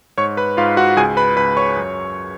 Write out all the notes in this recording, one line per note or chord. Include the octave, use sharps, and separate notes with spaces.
G#2 C#5 C#6
B4 B5
G#2 F4 F5
F#4 F#5
C#2 G#4 G#5
B4 B5
C#2 B4 B5
C#5 C#6
F#2